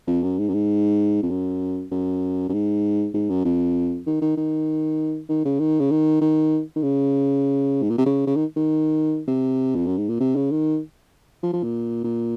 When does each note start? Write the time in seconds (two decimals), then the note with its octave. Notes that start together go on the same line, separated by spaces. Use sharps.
0.07 F2
0.23 F#2
0.38 G#2
0.49 F#2
0.54 G#2
1.23 F2
1.30 F#2
1.91 F#2
2.49 F#2
2.53 G#2
3.14 G#2
3.30 F#2
3.45 F2
4.07 D#3
4.21 D#3
4.37 D#3
5.29 D#3
5.45 C#3
5.59 D#3
5.80 C#3
5.91 D#3
6.21 D#3
6.76 D#3
6.83 C#3
7.82 G#2
7.90 A#2
7.98 C3
8.06 C#3
8.27 C#3
8.36 D#3
8.56 D#3
9.28 C3
9.75 F2
9.87 F#2
9.98 G#2
10.09 A#2
10.20 C3
10.36 C#3
10.51 D#3
11.43 F3
11.53 F3
11.63 A#2
12.04 A#2